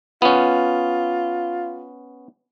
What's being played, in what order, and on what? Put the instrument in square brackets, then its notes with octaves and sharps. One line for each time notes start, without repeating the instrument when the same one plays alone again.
[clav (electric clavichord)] B3 C#4 [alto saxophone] F4